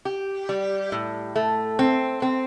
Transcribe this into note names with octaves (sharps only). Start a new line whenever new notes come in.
G4
G3
A2
A3
C4
C4